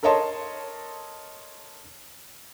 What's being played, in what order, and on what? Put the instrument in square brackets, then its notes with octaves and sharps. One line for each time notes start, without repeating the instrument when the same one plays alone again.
[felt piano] A4 A#4 C#5 D#5 A5 C6